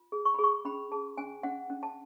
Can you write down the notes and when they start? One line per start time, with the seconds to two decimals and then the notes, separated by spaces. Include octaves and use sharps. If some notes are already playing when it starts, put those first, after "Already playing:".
Already playing: F4
0.12 G#4
0.25 C#6
0.34 B5
0.39 G#4
0.44 C#6
0.65 C#4 B5
0.91 G#4 A5
1.18 C#4 G#5
1.43 C#4 F#5
1.70 C#4
1.83 A5